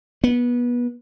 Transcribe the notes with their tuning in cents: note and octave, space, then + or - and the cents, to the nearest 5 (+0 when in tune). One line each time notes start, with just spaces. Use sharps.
B3 -25